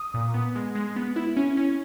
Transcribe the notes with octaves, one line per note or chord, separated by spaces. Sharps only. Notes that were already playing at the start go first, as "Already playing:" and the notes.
Already playing: D#6
A#2
B3
G#3
G#3
B3
E4
C#4
C#4